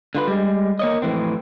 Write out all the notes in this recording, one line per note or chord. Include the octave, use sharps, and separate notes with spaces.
D3 F4 B4
G3 G#3
A#3 C#5 D#5
F2 A2 E3 C4